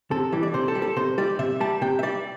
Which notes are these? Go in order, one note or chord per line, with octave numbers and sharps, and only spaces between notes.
C3 A4
E3 G3
D5
C3 C5
A4
G3
A4
C3 C5
G3 D5
C3 E5
G3 A5
C3 G5
E5
G3 D5